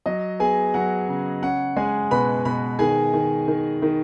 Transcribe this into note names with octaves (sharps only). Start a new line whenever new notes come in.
F#3 D#5
B3 G#4 G#5
F#3 F#5
C#3
C#4 F#5
G#3 G#4 G#5
B2 B4 B5
B2 B4 B5
D#3 G#4 G#5
D#3
D#3
D#3